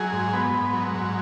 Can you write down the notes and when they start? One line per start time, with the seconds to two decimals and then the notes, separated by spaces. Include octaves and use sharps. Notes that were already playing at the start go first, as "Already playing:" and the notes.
Already playing: F#3 G#4
0.13 G#2
0.33 B3
0.54 G#2
0.73 F#3
0.94 G#2